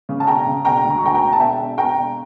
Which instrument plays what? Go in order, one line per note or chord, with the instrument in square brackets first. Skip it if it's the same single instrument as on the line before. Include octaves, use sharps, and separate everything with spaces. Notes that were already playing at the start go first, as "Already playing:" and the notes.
[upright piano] C#3
A5
E1 G5 A#5
C#3
E1 G5 A#5
D2
A#5
C#6
D2 G5 A#5
G5 A#5
E1
A5
E1 E5 G5
E1
E1 G5 A#5
E1